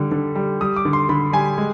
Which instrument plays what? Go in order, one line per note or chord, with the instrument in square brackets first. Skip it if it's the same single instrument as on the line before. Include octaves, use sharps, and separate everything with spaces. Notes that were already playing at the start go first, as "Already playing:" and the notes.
Already playing: [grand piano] D3 G3
D3
G3
G3 D#6
D6
D3
C6
D3 B5
G3 G#5
G#3